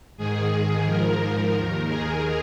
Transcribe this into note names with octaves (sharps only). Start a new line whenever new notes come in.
G#2 D#3 G#4
G#2 F3 A#4
D#2 D#3 A#4
G#4